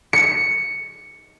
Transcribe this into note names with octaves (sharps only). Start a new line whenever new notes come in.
C#7